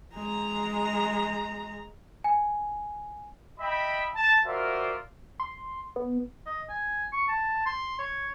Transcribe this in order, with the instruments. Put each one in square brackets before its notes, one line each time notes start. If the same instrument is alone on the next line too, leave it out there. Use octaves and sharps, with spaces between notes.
[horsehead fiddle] G#3 A#5
[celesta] G#5
[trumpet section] D#5 E5 G5 B5
A5
F4 F#4 A#4 C5 D5 E5
[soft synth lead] C6
B3
[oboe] D#5
G#5
C#6
A5
C6
C#5